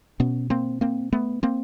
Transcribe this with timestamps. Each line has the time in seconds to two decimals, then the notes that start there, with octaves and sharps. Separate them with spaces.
0.20 B2 B3 C#4
0.50 A#3 C4
0.81 A#3 C4
1.13 A3 B3
1.43 A#3 C4